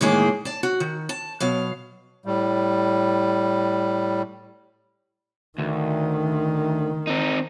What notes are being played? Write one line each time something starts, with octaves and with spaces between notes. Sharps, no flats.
A2 D#3 E3 G#3 A#3 G#4
D5 A5
F#4
D#3
A5
B2 F#3 F5
A2 G3
D2 D#3
C4 D#4